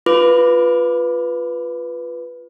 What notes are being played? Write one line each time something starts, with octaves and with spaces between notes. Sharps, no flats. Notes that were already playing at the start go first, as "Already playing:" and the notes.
F4 B4 D6